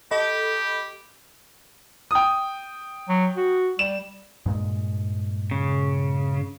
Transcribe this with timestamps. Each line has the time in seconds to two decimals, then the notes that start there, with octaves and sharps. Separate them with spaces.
0.11 G4 A4 D#5 B5
2.11 G5 D#6
3.09 F#3
3.37 F#4
3.79 G3 E7
4.46 G2 A#2 G#3
5.51 C#3